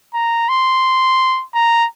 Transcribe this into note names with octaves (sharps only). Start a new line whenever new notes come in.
A#5
C6
A#5